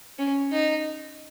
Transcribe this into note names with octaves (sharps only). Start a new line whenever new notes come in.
C#4
D#4